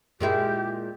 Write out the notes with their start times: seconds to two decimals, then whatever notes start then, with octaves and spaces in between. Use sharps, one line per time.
0.20 A#2 G#3 E4 G4